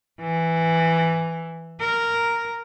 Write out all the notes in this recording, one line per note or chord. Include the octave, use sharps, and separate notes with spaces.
E3
A#4